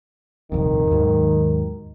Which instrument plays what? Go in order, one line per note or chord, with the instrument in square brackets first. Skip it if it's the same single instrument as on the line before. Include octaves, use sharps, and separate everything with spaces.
[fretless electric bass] D#1 C2 F2 [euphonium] D#3
[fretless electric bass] D#2 G#2 F#3